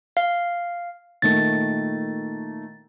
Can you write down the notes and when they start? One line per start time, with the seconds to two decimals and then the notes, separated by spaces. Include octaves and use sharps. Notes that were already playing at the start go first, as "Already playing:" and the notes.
0.17 F5
1.22 A#2 D#3 A3 A6